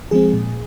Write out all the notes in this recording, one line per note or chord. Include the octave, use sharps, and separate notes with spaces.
F3 G#3 C4 G#4
A#2